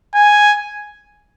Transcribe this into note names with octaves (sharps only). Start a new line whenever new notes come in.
G#5